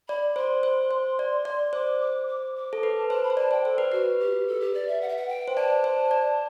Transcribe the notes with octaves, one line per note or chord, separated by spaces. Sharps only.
D5 B5
C5 C6
C5
C5
D5
D5
C5 D6
D6
D6
D6
A4
B4
A5
C5 A5
B5
C5
D5 A5
C5 G5
A4 C5
B4
F#4 B4
G4
A4
G4
D5
E5
F#5
E5
F#5
G5
C5
D5 A5
C5
D5